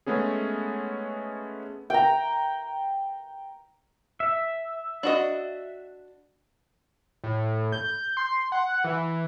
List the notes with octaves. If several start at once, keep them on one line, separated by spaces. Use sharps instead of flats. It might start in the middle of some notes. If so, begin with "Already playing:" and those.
G#3 A3 B3 C#4 G#4
G5 A#5
E5
D4 F#4 D#5
A2
G6
C6
F#5
E3